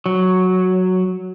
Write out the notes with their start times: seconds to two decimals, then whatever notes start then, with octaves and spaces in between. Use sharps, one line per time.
0.06 F#3